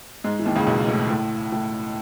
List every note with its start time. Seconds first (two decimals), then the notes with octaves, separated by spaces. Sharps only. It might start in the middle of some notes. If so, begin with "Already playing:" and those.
0.24 G#2 G#3
0.39 E3
0.46 D#2 D#3
0.55 C#2 C#3
0.67 B1 B2
0.88 A2
1.10 A2
1.52 A2